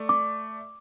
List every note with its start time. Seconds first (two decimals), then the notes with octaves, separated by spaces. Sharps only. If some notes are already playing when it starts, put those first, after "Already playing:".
Already playing: A3 D5
0.09 D6